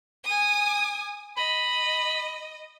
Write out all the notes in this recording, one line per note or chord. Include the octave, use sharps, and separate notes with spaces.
G#5 D#6
D#5 B5